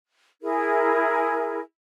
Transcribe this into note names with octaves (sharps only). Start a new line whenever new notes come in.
E4 G#4 A#4